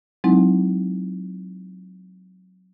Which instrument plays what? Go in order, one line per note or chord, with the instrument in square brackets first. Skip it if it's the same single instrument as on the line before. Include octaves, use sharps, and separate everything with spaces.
[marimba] F#3 G#3 C4 D#4 E4